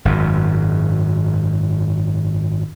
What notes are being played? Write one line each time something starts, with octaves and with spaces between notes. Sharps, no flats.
G#1 F#2